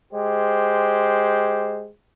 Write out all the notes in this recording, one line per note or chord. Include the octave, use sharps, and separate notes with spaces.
G#3 G4 C5